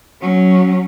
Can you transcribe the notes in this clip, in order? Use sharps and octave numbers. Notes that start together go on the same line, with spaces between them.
F#3 C#4